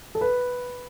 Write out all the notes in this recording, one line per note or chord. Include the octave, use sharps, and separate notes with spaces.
A4
B4